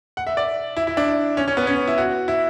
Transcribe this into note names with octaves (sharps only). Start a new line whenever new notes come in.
F#5
E5
D5
E4
E4
D4
C#4
C#4
B3
C#4
E4
F#4
E4